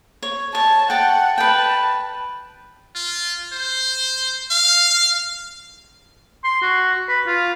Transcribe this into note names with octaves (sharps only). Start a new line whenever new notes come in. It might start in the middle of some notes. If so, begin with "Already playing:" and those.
C#5
C#5 A5
F#5 G5 A5
B4 G5 A5
F4
C5
F5
C6
F#4
B4
F4